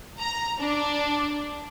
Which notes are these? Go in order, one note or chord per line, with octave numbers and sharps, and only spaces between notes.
A#5
D4